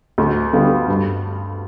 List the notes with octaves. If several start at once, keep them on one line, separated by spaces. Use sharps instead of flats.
D2
D3 G3 B3 F4
G2